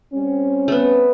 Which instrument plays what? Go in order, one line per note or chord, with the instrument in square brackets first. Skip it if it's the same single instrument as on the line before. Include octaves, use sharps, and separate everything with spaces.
[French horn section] G3 C4 C#4
[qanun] A3 B3